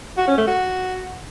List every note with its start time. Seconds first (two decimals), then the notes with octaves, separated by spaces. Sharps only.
0.18 F#4
0.27 C#4
0.37 A3
0.47 F#4